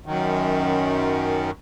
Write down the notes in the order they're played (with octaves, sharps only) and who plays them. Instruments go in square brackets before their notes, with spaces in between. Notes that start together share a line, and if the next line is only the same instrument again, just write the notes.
[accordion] F#2 D#3